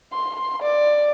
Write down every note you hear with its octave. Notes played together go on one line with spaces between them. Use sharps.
C6
D5